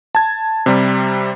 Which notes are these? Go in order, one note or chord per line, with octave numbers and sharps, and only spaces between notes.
A5 G#6
C3 G3